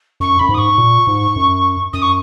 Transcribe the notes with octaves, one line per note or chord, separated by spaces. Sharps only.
F#2 C#6
F#2 B5
G#2
D#6
C#6
A#2
G#2
F#2
F#2 D#6
C#6